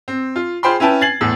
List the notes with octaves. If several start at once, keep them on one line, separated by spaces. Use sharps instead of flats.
C4
F4
F4 G#4 C5 G5 B5 C6
C#4 E4 B4 G5 A5
G#6 A6 C7 F#7
E2 A2 E6